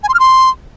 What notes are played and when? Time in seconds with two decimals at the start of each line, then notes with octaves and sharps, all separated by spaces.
0.03 G#5
0.09 C6
0.14 F6
0.19 C6